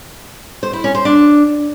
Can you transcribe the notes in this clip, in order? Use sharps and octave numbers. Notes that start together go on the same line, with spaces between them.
C5
E4
C#4
C5
D4